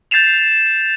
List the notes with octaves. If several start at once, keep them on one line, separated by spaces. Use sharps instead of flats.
G6 A6 C7 E7 F7